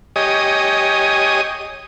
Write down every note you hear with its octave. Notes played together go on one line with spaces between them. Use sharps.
G4 C#5 D#5 G#5 D#6